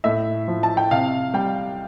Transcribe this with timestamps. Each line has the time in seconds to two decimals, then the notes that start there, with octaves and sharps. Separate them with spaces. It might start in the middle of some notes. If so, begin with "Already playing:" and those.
0.04 A2 E5
0.48 F3
0.63 A5
0.77 G5
0.91 C3 F5
1.34 G3 G5